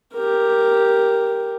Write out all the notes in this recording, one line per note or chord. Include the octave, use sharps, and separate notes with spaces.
G4 A#4